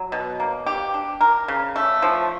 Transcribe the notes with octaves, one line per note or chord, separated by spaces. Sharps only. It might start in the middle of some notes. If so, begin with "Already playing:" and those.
Already playing: F#3
B2
A#3
G4
D4
A#4
C#3
A3
F3